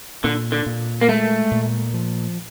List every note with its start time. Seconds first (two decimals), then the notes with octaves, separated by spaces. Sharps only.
0.24 A#2 D3
0.52 D3
0.66 A#2
1.01 A#3
1.09 G#3 A3
1.51 A#2
1.94 F3